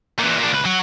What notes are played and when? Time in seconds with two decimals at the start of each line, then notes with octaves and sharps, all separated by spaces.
0.20 A#2 E3
0.39 A#2 D4
0.51 C#2 B4
0.65 F#3 F#4